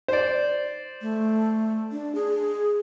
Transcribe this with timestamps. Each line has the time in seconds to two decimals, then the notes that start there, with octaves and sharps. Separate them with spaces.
0.08 C5 D5
1.02 A3
1.92 D4
2.15 G#4